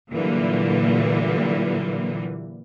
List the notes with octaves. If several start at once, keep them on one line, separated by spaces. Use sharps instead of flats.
A#2 D3 E3 F#3 G3 A#3